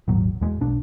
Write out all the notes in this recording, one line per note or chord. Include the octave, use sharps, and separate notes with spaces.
D#1 G#1 F#3
E2 G#3
B1 D4